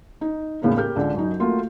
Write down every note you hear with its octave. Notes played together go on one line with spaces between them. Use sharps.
D#4
E2 A2 C#3 A#3 C#4 D#4
G4 A#4 F6 G6
C#2 D3
F#2 D#4
A3 A#3 F4 F#4